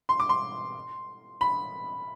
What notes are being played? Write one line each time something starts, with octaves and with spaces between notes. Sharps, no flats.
C6
D6
C6
B5